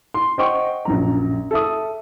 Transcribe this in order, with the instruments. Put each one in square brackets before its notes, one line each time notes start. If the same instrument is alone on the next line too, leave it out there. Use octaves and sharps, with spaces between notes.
[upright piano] C6
C5 D#5 F#5 G5 C#6
A#1 F#2 A#5
A4 E5 D#6